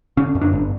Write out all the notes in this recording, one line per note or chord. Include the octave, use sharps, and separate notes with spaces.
D3 C#4
F#2
D4
G1